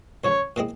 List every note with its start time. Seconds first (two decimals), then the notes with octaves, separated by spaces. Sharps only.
0.24 C#2 C#3 F3 C#5
0.56 A#2 G#3 C4 E4 G#4